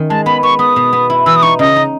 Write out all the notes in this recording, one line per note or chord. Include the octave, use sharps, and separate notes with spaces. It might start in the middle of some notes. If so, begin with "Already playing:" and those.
Already playing: D#3 C#4
G#3 A5
B3 B5
B3 C#6
B3 D#6
B2
B3
E4
E3 E6
D#6
D#4 C#6
C#3 D#5
D#4